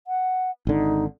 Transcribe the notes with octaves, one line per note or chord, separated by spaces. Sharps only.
F#5
G#1 D3 D#4